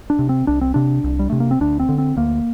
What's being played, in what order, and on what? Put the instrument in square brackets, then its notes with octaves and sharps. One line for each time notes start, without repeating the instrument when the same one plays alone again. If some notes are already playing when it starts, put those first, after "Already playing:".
[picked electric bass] D4
C3
C4
C2 D4
C4
C3 D4
C2
G3
C3 A3
A#3
C4
D2 D4
C4
D3
C4
D2 A#3